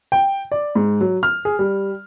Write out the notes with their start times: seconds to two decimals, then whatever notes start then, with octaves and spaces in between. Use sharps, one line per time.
0.12 G5
0.52 D5
0.75 G#2
1.01 F#3
1.23 F6
1.45 G#4
1.59 G3